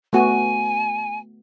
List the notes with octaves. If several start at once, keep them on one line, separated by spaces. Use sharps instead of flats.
A3 B3 F#4 G#5